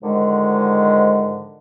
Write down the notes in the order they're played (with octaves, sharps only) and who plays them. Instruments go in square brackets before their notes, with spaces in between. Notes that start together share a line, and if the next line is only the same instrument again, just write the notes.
[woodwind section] G#2 D3 D#3 F3 G#3